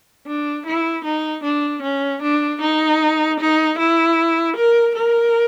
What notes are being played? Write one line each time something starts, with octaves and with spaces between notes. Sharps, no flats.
D4
E4
D#4
D4
C#4
D4
D#4
D#4
E4
A#4
A#4